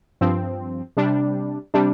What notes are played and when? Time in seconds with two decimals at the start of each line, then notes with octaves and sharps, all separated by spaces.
0.21 G2 F3 C4
0.97 C3 G3 D4
1.74 C3 G3 D4